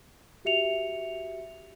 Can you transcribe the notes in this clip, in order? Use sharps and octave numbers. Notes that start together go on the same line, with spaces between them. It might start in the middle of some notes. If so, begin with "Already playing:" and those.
F#4 G4 E5 C#7 F7